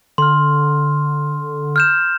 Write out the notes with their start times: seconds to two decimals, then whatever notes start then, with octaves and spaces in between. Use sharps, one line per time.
0.18 D3 C6 F6
1.76 F6 G6 E7